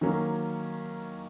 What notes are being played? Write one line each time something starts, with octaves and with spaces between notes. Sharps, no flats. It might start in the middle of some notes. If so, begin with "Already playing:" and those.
D#3 F#3 A#3 C#4